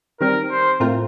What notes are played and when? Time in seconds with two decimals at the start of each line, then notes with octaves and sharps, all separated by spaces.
0.21 D#3 G3 C4 A#4
0.51 C5
0.80 A2 A3 C4 F4 A#4